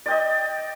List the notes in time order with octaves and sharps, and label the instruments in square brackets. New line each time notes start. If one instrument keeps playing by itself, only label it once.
[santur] D5
G5
D#5